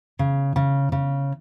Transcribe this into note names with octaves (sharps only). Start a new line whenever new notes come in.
C#3
C#3
C#3